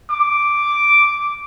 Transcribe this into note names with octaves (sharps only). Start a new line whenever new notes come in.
D6